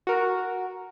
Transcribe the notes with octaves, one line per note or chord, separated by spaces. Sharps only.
F#4 A#4